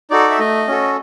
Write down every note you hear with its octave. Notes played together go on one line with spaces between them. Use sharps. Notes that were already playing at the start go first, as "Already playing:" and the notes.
D#4 F#4 A4 D5
E5
A3 D#5
C#4 F#4 A4